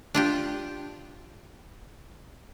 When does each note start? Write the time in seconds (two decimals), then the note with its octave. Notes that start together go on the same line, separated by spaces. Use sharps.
0.15 D4 F4 G4